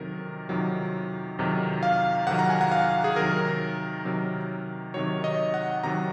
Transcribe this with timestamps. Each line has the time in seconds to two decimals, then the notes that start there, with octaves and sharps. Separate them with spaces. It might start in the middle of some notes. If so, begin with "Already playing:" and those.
Already playing: F2 C3 D#3 F#3 A#4
0.49 F2 C3 D#3 F#3
1.38 F2 C3 D#3 F#3
1.83 F5
2.27 F2 C3 D#3 F#3 F#5
2.39 A#5
2.50 G#5
2.61 F#5
2.72 F5
3.04 G#4
3.16 C3 D#3 F#3 A#4
4.05 C3 D#3 F#3
4.94 C3 D#3 F#3 C#5
5.24 D#5
5.54 F#5
5.83 C3 D#3 F#3 A#5